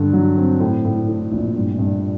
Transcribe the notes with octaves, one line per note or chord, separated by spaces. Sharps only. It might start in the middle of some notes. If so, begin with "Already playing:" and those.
Already playing: G2 D3
F#3
C4
A2
A2
A2
A#1
G2
G2